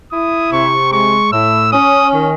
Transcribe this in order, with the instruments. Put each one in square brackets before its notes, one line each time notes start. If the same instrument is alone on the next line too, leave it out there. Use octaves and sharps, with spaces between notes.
[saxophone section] E4 [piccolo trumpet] D#6
[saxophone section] C3 [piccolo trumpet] C#6
[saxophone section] G#3 [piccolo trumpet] C#6
[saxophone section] A2 [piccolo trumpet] E6
[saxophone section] C#4 [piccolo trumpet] D#6
[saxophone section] D#3